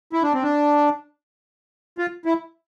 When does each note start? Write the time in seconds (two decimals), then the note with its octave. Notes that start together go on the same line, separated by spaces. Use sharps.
0.13 E4
0.23 D4
0.33 C4
0.43 D4
1.98 F4
2.25 E4